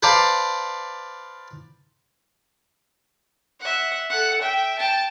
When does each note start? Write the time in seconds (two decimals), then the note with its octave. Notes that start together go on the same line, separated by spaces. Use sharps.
0.03 B4 C5 D5 F5 A5 A#5
3.61 E5 F#5
4.10 A4 F#5
4.41 E5 G5
4.78 G5 A5